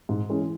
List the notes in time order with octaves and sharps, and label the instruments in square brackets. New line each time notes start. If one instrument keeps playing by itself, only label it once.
[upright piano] G#2
E3 G#3 C#4